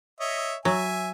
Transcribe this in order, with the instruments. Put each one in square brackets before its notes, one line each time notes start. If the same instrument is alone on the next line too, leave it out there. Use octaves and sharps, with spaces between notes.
[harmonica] C#5 D#5 E5
[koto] F#3 [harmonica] E5 G#5